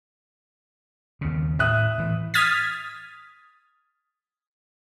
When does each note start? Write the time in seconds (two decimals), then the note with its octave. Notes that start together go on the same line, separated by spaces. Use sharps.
1.21 D#2 C#3
1.59 A2 E5 D#6 F#6
1.98 A2 E3
2.34 D#6 F6 G#6 A6 B6